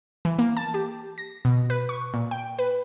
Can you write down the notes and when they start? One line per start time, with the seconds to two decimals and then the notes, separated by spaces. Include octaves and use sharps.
0.25 E3
0.39 A#3
0.57 A5
0.74 G4
1.18 A#6
1.45 B2
1.70 B4
1.89 C#6
2.14 A#2
2.31 G5
2.59 B4